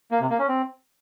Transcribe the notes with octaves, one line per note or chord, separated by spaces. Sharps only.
A#3
C3
A#3
C#4
C4